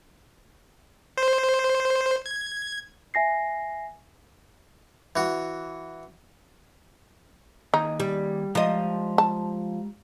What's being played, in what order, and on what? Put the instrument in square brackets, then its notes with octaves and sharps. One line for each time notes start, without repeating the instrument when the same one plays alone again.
[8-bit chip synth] C5
G#6
[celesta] E5 G#5 A#6 C7
[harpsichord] E3 F#4
[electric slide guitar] D#3 A#3 G#4 [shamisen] D#4
[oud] G3
[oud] F3 D#5 [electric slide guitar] G#3 G4 A#5
[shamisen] A5